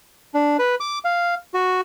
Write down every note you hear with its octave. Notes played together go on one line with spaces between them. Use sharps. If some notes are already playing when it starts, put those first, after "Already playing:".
D4
B4
D6
F5
F#4